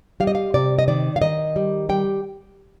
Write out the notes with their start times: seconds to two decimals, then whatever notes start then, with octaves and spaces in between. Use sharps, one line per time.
0.20 G3 F5
0.27 D#5
0.35 F5
0.54 C3 D5
0.79 D#5
0.88 D#3 D5
1.16 F5
1.22 D#3 D#5
1.56 G3
1.89 G3 G5